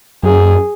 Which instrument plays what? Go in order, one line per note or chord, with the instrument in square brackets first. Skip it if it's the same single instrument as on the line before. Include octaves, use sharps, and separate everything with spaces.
[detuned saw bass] F#2 [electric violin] G#4